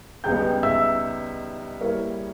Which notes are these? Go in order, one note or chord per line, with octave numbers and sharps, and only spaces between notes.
C#2 C#3 G3 B3 D#4 G5 G6
E5 E6
G3 A#3 E4 A#4 C#5